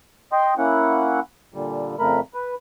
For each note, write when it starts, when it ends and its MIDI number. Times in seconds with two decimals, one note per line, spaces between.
0.32 0.54 75
0.32 0.54 79
0.32 0.54 84
0.58 1.20 58
0.58 1.20 61
0.58 1.20 64
0.58 1.20 78
1.54 1.96 46
1.54 1.96 50
1.54 1.96 55
1.99 2.20 41
1.99 2.20 49
1.99 2.20 57
1.99 2.20 70
1.99 2.20 83
2.34 2.55 71